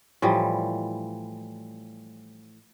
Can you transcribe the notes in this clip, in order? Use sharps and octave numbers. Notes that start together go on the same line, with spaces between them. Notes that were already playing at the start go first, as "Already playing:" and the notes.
A2 E3 F3 G3